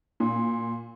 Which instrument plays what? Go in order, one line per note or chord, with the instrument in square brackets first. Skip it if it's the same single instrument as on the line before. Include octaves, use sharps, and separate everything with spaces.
[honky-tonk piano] A#2